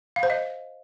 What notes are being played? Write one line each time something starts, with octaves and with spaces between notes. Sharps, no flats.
F5
C5
D#5